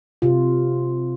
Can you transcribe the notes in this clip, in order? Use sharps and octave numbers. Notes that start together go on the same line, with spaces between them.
C3 F4